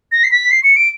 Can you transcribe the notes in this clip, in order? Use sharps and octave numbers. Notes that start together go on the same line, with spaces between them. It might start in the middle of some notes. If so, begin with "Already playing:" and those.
A#6
C7
B6
C7
C#7
D7